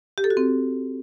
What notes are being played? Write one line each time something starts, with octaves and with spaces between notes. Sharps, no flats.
G4
A4
F#4
C4